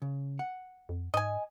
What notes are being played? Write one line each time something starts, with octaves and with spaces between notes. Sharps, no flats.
C#3
F#5
F2
G#2 D#5 G#5